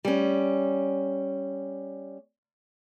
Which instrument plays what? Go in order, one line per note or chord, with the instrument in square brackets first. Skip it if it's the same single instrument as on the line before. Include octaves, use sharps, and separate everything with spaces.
[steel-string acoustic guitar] G3 C#4